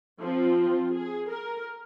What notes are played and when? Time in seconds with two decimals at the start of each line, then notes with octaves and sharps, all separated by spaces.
0.19 F3 C4
0.56 F4
0.92 G#4
1.29 A#4